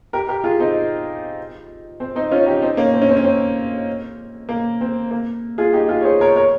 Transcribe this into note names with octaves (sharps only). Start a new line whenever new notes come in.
G4 A#4
G4 A#4
F4 G#4
C4 D#4
C4
C4 D#4
C#4 F4
D#4 G4
C4 D#4
A#3 C#4
C4
C#4
C4
C#4
C4
A#3
C4
A#3
F4 G#4
D#4 G4
F4 G#4
C#5
G#4 C5
A#4 C#5
A#4 C#5